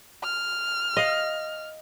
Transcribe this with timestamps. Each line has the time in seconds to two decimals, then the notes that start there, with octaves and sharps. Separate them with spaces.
0.23 F6
0.97 D#5 F5